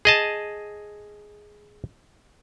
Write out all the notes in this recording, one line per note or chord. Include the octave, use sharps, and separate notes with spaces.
G#4 D#5 A5